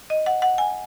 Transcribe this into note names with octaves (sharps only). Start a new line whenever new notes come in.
D#5
F#5
F#5
G#5